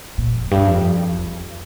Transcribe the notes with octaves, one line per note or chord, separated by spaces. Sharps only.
A#2
F2
G2
F2
E2